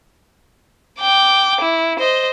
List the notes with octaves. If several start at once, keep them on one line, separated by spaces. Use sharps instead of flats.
G5 D6
E4
C5 D#5